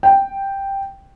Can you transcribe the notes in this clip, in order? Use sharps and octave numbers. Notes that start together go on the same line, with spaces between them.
G5